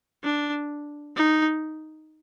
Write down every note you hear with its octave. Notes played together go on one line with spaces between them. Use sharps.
D4
D#4